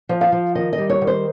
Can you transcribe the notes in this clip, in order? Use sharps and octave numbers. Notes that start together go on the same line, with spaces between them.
F3
F5
F3
D#3 D#5
D#5
G3
C#5
D#3
C5